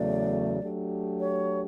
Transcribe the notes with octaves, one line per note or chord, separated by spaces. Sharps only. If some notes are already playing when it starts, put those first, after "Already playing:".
Already playing: E2 C#3 F#3 A3 D5
F#3 A3 D4 G4
C#5